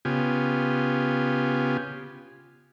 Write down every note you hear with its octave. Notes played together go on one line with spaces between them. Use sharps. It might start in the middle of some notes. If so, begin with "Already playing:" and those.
C#3 B3 F4 G4 G#5